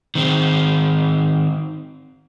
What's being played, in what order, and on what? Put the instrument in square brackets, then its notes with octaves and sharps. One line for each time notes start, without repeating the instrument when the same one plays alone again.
[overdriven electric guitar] D#3 C4